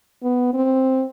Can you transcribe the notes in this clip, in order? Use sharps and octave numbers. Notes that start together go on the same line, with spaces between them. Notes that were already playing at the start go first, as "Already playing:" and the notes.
B3
C4